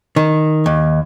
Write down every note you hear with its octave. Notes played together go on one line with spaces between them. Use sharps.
D#3
D#2